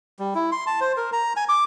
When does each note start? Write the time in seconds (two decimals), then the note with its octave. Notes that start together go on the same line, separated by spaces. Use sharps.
0.19 G3
0.35 E4
0.52 C6
0.67 A5
0.81 C5
0.97 A#4
1.13 A#5
1.36 G#5
1.49 D6